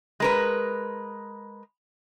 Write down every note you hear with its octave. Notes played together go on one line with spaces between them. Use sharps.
G#3 A#4 B4